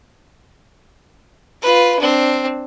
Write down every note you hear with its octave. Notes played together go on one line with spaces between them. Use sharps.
F4 B4
C4 D4